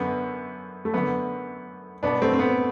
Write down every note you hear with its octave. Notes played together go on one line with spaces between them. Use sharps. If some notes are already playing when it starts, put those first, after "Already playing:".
Already playing: F#2 D3 B3
A3
F#2 D3 B3
C2 B2 B3 D4
A3 C4
C4
B3